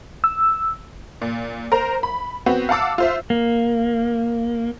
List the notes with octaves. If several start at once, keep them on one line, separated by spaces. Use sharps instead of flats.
E6
A#2
A#4 C5 A#5
B5
B3 C4 F#4
F5 F#5 A5 D6 E6
F4 C5 E5
A#3